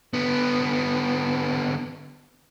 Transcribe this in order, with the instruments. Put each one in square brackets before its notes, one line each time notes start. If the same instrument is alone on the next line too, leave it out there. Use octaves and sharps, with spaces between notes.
[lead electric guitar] D3 B3